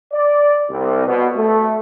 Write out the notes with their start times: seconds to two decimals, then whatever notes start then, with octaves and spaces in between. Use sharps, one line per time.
0.12 D5
0.69 C2
1.06 B2
1.36 A3